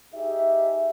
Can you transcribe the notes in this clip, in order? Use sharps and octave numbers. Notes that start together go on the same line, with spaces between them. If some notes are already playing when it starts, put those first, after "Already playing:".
D#4 G4 G#4 D#5 E5